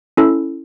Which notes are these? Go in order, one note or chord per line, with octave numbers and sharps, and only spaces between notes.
C#4 E4 A4